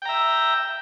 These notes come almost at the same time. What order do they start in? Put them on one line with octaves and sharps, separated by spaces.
G5 A#5 E5